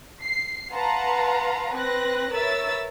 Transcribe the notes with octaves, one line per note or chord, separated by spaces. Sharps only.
C7
B4 F5 F#5 A5 A#5 C6
C4 B4 F#6 A#6
A#4 B4 C#5 E5 E6 A6